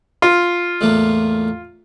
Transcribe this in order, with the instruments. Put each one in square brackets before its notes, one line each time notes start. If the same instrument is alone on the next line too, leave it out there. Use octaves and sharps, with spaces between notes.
[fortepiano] F4
[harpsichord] E2 A2 A#3